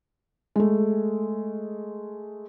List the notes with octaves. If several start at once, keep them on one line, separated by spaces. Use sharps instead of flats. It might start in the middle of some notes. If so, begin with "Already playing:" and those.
G#3 A3